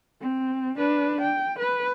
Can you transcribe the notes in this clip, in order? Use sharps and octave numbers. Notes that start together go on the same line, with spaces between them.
C4
D4 B4
G5
B4